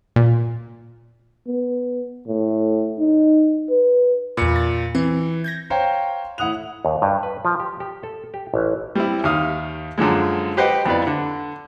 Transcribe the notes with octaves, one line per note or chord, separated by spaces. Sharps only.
A#2
B3
A2
D#4
B4
E2 A#2 B5 C#7
A6
E3 C4
G6 G#6 A#6
C5 C#5 F5 G5 A#5
A2 E4 F#5 D#6 F#6 F7
D#2
G2
B4
F3
G4
G4
A4
G4
A1
G3 C4 E4
D#2 D#3 E5 F5 D#6 F6
F#2 D3 F3 G#3
G4 B4 C5 D#5 F#5 G5
F2 B3 E4 B4 D5
D3